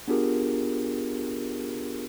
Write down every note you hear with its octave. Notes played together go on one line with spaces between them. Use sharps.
B3 D4 F4 G4 G#4 A#4